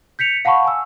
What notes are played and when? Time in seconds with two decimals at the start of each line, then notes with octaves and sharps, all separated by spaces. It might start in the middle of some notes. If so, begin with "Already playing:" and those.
0.19 G6 B6 C#7 F7
0.45 F5 F#5 A5 B5 C#6
0.65 G#5 E6